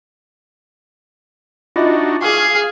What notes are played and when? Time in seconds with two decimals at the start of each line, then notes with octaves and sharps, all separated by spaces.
1.76 D4 D#4 F4 F#4 D#5 E5
2.22 G#4 F5 C#6 D6